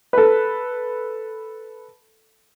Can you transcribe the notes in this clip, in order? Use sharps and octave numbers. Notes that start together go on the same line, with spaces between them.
A4 B4